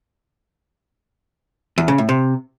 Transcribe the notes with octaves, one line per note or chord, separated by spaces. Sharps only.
E2
C#3
A2
C3